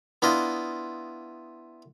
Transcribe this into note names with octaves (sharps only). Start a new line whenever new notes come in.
B3 D4 E4 F4 D#5